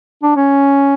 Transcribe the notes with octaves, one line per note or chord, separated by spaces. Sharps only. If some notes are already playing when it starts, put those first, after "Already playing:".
D4
C#4